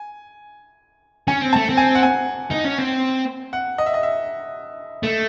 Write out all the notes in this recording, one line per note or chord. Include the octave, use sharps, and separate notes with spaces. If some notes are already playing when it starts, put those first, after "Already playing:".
Already playing: G#5
C#4 G#5
C4
A5
A3
C4
G#5
F#5
G#5
D#4
C#4
C4
F#5
D#5
E5
D#5
E5
A3